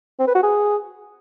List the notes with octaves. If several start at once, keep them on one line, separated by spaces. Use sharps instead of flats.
C4
B4
F#4
G#4